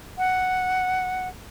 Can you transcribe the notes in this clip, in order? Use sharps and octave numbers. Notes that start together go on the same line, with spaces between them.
F#5